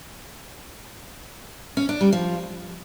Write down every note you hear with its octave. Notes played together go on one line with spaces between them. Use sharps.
C#4
D4
G3
F3